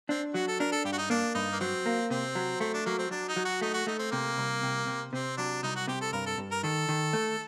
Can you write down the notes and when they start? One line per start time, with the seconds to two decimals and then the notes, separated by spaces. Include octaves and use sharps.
0.09 C4 D4
0.34 F#3 F#4
0.48 A4
0.59 D4 A#4
0.72 A4
0.85 G2 G4
0.92 F#4
0.98 D#4
1.10 A#3 D4
1.34 G2 D#4
1.52 A#3
1.60 F#3 C4
1.86 A#3
2.10 C3 C4
2.35 F#3
2.60 A3 C4
2.74 D4
2.86 F#3 A#3
2.98 C4
3.11 F#3 D4
3.28 D#4
3.36 F#3
3.45 F#4
3.61 A3 D#4
3.74 F#4
3.87 A3 D#4
3.99 C4
4.11 C3 A#3
4.38 C2
4.63 C3
4.87 C3
5.13 C3 C4
5.37 F#3 D4
5.63 C2 D#4
5.76 F#4
5.87 C3 G4
6.01 A4
6.13 G2 A#4
6.26 A4
6.38 G2
6.51 A#4
6.63 D#3 A4
6.89 D#3
7.13 A3